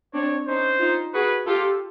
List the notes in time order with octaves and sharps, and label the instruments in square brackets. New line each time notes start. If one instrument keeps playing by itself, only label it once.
[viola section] C4 D4 [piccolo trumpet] C#5
[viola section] C#4 D#4 [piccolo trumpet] C5
[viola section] D#4 F4
[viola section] F#4 G#4 [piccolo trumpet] B4
[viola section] F4 G4 [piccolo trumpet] A4